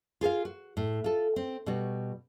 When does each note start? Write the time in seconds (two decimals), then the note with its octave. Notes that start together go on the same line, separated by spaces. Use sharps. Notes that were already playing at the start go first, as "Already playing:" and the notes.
0.21 F4 G#4 A#4 F5
0.45 F#4
0.77 A2
1.04 F4 A4
1.36 C4
1.66 B2 G3 F#4